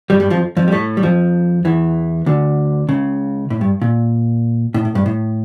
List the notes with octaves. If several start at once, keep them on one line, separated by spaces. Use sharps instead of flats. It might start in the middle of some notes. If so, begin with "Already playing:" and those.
G2 G3
G2 G3
F2 F3
F2 F3
G3
A2 A3
G3
F2 F3
E2 E3
D2 D3
C#2 C#3
A2
G2
A#2
A2
A2
G2
A2